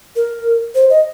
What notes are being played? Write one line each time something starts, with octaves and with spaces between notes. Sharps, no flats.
A#4
C5
D#5